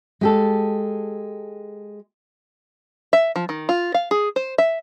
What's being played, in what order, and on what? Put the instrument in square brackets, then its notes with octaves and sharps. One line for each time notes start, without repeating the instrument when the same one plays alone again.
[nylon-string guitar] G#3 G4 A4
[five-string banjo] E5
F3
D#3
F4
F5
G#4
C5
E5